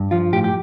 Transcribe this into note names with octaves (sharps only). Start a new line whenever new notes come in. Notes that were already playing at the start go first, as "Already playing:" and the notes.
Already playing: G2
F3 F4
A2 G4
G4